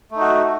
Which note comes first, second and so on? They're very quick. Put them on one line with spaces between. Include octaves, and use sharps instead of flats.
A3 D#4 F#4